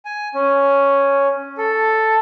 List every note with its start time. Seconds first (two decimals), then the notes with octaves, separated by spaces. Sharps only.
0.05 G#5
0.34 C#4
1.58 A4